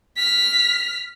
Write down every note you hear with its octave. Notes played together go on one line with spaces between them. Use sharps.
F6 B6